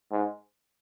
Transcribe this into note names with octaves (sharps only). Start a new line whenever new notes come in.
G#2